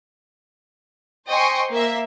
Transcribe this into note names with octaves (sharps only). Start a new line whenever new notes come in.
C5 D#5 G5 G#5 C6 C#6
A#3 E5